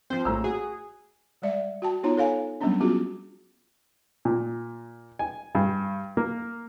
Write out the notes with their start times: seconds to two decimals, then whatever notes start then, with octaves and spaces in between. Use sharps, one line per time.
0.10 F3 C4 C5
0.25 A#1 A2 C#3 A#5 E6
0.44 F#4 G#4
1.42 G3 G#3 D5 E5
1.82 F#4 G5 A5
2.03 B3 D#4 F4 C#5 A#5
2.17 A4 C#5 F5 G#5
2.61 F#3 G3 A#3 B3 C#4 D4
2.81 B3 C#4 F4 F#4 G#4
4.25 A#2
5.19 G#5
5.55 G2
6.17 A#3